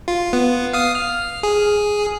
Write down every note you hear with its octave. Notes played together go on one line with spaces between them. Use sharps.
F4
B3
F5 D#6 C7
F6
G#4